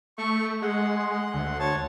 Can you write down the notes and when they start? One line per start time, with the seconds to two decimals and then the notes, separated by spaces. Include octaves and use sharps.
0.18 A3 C#6
0.62 G#3 F#5 C6
1.34 D2
1.60 C#5 A5